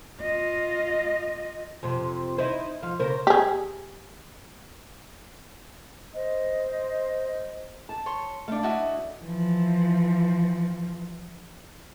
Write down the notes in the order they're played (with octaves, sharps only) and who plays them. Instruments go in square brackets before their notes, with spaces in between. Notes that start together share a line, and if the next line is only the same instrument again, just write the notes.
[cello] F4 D#5
[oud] F2 C3
D#4 E4 C5
F3 F5
C#3 A#4 C5
[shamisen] G4 G#4
[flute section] C5 D#5
[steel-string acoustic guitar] A5
[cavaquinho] C#5 C6
[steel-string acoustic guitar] A3 D4 [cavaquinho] F5
[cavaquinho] E4 F#4 D#5
[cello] E3 F3